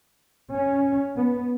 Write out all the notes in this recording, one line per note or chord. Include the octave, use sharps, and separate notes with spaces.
C#4
B3